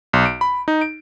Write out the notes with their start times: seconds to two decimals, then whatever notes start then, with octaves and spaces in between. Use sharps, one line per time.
0.13 B1
0.26 D7
0.41 B5
0.68 D#4
0.81 D7